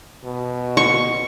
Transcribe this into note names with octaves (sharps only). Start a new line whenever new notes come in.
B2
C#6